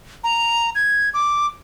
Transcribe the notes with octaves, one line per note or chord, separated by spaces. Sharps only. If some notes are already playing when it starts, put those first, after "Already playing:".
A#5
G#6
D6